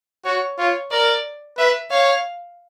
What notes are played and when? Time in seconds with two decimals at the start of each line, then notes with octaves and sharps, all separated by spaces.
0.25 F#4 C#5
0.58 F4 C#5
0.91 A#4 D5
1.58 B4 E5
1.91 C#5 F5